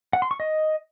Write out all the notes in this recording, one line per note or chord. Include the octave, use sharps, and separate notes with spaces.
F#5
C6
C#6
D#5